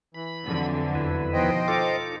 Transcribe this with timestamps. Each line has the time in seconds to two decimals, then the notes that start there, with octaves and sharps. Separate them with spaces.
0.14 E3 B5
0.45 F2 D3 F#3
0.95 E2 E4 B4
1.33 B2 D#3 F3 C5 D#5 G5
1.68 D#4 F4 A4 D6